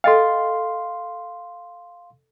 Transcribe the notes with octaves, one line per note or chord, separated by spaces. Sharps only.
A4 D#5 F5 G5 C6